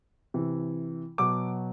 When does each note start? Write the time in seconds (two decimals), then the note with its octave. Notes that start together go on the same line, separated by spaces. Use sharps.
0.34 C3 E3
1.18 B2 F#3 D6